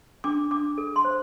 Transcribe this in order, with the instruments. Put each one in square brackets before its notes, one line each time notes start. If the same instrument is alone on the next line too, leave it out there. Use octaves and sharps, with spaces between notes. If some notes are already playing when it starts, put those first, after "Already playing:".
[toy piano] D4 D6
D4 D6
A4
C6
C5